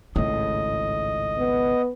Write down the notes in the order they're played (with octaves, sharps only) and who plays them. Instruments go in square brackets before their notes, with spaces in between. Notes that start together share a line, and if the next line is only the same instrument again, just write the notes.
[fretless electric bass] G#1 C#2 A2 [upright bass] A3 [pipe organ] D#5
[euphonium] B3